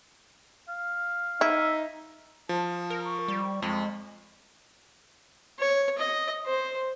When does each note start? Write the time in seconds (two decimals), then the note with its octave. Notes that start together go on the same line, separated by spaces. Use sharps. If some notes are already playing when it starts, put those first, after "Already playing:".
0.68 F5
1.41 D#4 E4 E5
2.49 F3 A5
2.90 A#4
3.04 C#6
3.28 G3
3.62 F2 G#3
5.60 C#5
5.98 D#5
6.46 C5